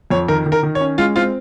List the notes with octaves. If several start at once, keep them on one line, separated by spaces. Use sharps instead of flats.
F2 C#5
D#3 A#4
D#3
A#4
D#3
C#5
C#4
G#3 F4
C4 F4